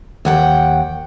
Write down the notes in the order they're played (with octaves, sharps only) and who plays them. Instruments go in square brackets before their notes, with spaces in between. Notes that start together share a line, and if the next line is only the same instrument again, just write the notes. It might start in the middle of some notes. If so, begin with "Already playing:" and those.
[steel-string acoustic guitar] D#2 F#5 G5